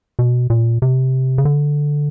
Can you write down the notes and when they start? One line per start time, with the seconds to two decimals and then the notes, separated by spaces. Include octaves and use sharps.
0.19 B2
0.50 A#2
0.82 C3
1.38 C#3
1.45 D3